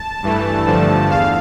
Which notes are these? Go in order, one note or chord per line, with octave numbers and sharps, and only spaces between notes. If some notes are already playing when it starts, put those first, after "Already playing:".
Already playing: A5
G2 E3 A3
G2 D3 F3 A3
E2 F5